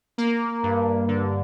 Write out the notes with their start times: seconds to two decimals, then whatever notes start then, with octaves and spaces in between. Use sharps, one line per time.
0.18 A#3
0.63 G2
1.08 D3